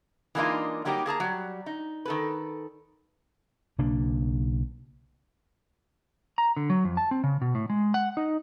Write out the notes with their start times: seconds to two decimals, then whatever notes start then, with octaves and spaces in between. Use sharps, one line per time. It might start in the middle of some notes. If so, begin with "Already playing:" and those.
0.35 E3 G#3 A#3 D4 D#4 F4
0.85 F#3 G3 A#3 D#4 G4
1.06 A#3 G#4 A5 A#5
1.20 F#3 G3
1.66 D#4
2.05 D#3 A4 B4
3.78 B1 C#3 A#3 D4
6.38 A#5
6.57 D3
6.70 F#3
6.85 F2
6.97 A5
7.11 C4
7.24 C#3
7.41 B2
7.55 A2
7.70 G#3
7.94 F#5
8.17 D#4